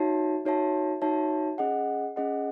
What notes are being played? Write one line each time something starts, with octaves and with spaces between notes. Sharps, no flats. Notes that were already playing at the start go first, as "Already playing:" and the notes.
Already playing: D#4 F#4 C#5 E5 A5
D#4 F#4 C#5 E5 A5
D#4 F#4 C#5 E5 A5
C#4 G#4 D#5 F#5
C#4 G#4 D#5 F#5